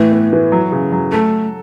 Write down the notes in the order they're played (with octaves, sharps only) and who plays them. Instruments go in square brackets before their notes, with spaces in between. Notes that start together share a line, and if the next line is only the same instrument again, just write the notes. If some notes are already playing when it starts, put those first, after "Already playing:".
Already playing: [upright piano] A2 E3 [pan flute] A3
[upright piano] B3
E3
F#3
C#3
F#3
[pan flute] A3 [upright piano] A4